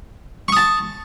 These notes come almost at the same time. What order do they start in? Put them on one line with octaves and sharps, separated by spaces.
C#6 D#6 A5